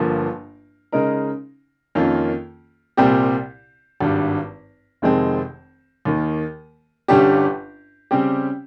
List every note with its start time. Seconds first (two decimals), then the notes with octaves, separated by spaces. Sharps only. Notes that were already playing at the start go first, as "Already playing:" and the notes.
Already playing: G1 G2 F3 A#3
0.92 C#3 G#3 D#4 A#4
1.95 F2 D#3 A#3 C#4 F4
2.97 C2 A#2 G3 C4 G4
4.00 G#1 G2 G3
5.02 F1 F2 D#3 G#3 C4
6.05 D#2 D#3 A#3
7.08 G1 G2 G3 C#4 G4
8.11 C#3 G3 C4 G4